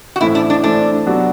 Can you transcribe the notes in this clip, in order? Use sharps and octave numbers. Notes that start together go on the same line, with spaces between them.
F#4
A2 E3 A3 C4 E4
D4
D4
A2 E3 A3 C4 D4
C3 F#3 B3 D4 F#4